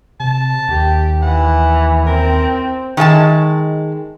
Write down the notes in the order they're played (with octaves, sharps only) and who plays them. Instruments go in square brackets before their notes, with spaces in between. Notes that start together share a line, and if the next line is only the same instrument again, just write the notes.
[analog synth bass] C3 [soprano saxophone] A5
[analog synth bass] D#2 [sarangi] G4
[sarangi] E3 [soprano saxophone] F#5
[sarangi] C4 [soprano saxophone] A#4
[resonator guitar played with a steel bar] D#3 G#3 E5 A5